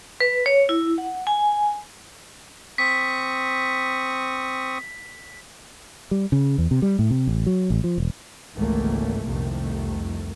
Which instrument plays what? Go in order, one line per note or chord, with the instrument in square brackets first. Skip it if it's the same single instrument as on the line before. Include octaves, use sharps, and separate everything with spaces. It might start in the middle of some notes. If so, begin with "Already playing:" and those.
[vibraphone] B4
C#5
E4
F#5
G#5
[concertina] C4 C#6 D#6 [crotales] B6
[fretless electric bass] G3
C#3
E2
C3
G3
A2
C3
A1
F#3
A1
F3
E1
[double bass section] G#1 C#2 G#2 E3 A3 A#3
C2 F2 C3 D#3 A3